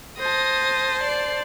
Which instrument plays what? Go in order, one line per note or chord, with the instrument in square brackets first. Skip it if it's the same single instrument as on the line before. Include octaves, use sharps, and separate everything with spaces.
[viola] C5 A5 [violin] D#6 A#6
[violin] D5 C7